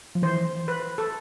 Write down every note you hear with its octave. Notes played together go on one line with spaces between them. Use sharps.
F3
E3 C5
B4
A4